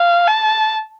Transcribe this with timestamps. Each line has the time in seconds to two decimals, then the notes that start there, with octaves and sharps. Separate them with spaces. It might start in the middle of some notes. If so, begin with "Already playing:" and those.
Already playing: F5
0.28 A5